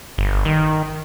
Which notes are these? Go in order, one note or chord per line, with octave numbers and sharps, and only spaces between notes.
G1
D#3